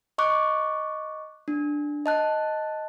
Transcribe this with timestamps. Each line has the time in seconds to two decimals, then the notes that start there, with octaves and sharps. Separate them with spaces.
0.18 D#5 C#6 D6 F#6
1.48 D4
2.06 D#5 A5 F#6